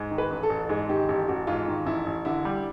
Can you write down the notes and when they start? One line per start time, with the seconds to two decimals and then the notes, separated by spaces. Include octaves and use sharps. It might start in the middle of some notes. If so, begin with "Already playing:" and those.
Already playing: G#2
0.11 D#3
0.18 B4
0.31 A1
0.43 A4
0.49 A1
0.69 G#2 G#4
0.89 D#3 G4
1.08 A1 G4
1.28 A1 F#4
1.47 G#2 F4
1.68 D#3
1.86 A1 E4
2.06 A1
2.25 D3 E4
2.45 G3